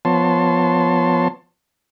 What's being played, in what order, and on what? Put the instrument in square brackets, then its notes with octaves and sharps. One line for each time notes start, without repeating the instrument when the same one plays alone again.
[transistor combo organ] F3 B3 C#5 A5 C6